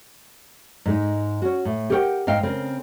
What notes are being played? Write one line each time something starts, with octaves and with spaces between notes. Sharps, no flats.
G#2 G#3 D#4
C#4 F#4
A2
G4 A4 A#4 C#5 F#5 G5
G#2 D#5 F5 G5
C#3 C4 A#4